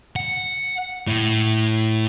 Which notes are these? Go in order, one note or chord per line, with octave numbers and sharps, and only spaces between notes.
F#5
A2